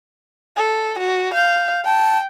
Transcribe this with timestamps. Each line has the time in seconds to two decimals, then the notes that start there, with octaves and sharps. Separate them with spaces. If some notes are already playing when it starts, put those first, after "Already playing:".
0.57 A4
0.99 F#4
1.34 F5 G6
1.85 G5 A5